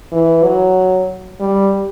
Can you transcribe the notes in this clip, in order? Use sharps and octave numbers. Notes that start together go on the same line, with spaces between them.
E3
F#3
G3